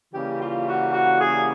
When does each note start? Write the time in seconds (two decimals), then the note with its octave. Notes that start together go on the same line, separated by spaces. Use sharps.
0.12 C#3 E3 G3 A#3 G4
0.40 F4
0.67 F#4
0.93 F#4
1.20 G#4